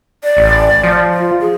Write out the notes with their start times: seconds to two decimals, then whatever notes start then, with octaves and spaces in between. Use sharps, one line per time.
0.24 D5
0.37 A1
0.83 F3
1.14 F4
1.41 G#4